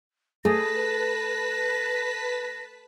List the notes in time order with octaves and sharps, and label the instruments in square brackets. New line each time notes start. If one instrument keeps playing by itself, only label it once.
[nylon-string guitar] A3 [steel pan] G#4 [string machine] B4 A5 B6 [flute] A#6